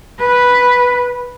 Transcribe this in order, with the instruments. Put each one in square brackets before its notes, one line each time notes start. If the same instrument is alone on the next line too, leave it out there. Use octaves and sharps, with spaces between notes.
[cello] B4